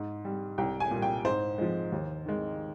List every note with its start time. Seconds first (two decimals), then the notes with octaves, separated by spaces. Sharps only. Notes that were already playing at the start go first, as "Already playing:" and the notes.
Already playing: G#2
0.25 G3
0.58 C2 G5
0.80 G#5
0.91 A#2 G3
1.02 G5
1.25 G#2 C5
1.58 F3 G#3
1.92 D#2
2.26 D#3 G#3